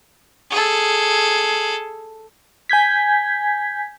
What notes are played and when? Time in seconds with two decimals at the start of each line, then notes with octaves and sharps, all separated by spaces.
0.51 G#4 A4
2.69 G#5 G6 G#6 B6